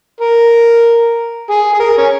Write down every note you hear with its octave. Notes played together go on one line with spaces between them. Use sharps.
A#4
G#4
G#4
A#4
C#4